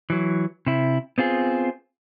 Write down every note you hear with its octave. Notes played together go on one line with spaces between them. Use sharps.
E3 F#3
C3 E4
B3 C4 F4 G#4